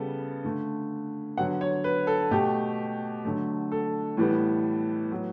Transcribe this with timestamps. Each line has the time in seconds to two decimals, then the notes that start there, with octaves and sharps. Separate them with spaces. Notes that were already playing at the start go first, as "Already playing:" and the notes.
Already playing: C#3 G3 B3 A4
0.44 D3 A3
1.37 D3 F#3 B3 F#5
1.61 C#5
1.84 B4
2.07 A4
2.31 B2 A3 G4
3.25 D3 F#3 A3
3.72 A4
4.17 A2 E3 G3 B3
5.12 A2 F#3 B3